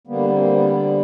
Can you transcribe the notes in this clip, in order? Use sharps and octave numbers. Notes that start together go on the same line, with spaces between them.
D3 G3 A#3 B3
A#3 C4
B3